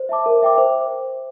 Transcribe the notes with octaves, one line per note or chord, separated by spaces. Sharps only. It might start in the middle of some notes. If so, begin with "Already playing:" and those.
Already playing: C5
E5 A5 D6
A#4
E5 G5 D6
C5